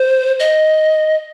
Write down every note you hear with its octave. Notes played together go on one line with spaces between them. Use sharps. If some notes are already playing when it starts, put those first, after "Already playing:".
Already playing: C5
D#5